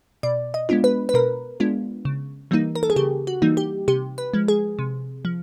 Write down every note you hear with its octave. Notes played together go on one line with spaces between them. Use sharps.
B2 D5
D#5
G#3 B3 D4 F4
B4
B4
B2 A#4
G#3 B3 D4 F4
C#3
E3 G3 A#3 D#4
A#4
A4
G#4
C#3 G4
F#4
E3 G3 A#3 D#4
G4
C3 G4
B4
F3 G#3
G#4
C3
F3